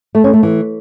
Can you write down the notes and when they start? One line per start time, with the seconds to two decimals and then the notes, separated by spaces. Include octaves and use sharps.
0.15 A3
0.24 C#4
0.34 A3
0.43 E3